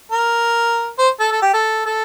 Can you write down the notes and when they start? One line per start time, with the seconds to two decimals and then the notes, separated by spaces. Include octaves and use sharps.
0.11 A#4
0.98 C5
1.20 A4
1.31 A4
1.42 G4
1.53 A4
1.86 A4